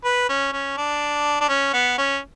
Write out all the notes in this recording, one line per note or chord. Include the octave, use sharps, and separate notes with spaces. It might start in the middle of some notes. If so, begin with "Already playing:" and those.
B4
C#4
C#4
D4
D4
C#4
B3
C#4